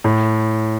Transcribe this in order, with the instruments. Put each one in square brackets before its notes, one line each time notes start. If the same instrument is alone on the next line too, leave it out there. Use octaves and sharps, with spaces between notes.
[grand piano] A2